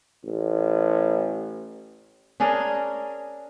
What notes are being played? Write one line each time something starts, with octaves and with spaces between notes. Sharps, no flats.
A1
C#4 D4 G#4 A#4